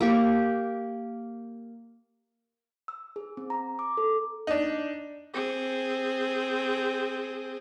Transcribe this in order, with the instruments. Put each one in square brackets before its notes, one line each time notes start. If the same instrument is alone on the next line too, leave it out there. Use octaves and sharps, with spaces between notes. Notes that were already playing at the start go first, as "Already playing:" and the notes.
[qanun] A#3 G4 C#6
[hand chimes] E6
G#4
C4
A#5
D6
A4
[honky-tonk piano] D4 D#4
[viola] C4 G#4